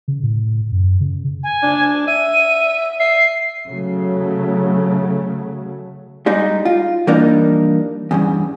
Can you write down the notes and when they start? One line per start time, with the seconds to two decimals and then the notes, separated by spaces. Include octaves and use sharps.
0.08 C#3
0.23 A2
0.72 F#2
1.00 C#3
1.43 G#5
1.63 D4
2.08 E5 D#7
3.00 E5 C7
3.68 C#3 F#3 A3
6.26 G3 G#3 D#4
6.65 F4
7.07 E3 F3 G3 A#3 D4 D#4
8.11 E2 G2 C#3